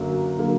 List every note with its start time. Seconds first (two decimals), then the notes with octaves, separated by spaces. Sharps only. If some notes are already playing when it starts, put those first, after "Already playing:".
Already playing: F#2 D3 F#3 A#3
0.38 D3 F#3 A#3